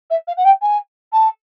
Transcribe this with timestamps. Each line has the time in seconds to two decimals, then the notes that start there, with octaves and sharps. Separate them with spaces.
0.10 E5
0.27 F5
0.37 F#5
0.44 G5
0.62 G#5
1.13 A5